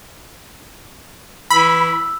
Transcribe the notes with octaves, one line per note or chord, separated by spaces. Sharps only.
E3 B5 E6